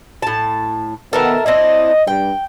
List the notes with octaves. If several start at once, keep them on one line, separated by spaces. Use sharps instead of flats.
A2 A5
B2 D#3 B3 A4 A#4 E5
C4 D4 E4 D#5
G2 G5